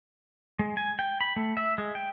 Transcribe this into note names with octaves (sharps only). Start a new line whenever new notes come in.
G#3
G#5
G5
B5
A3
E5
G#3
G5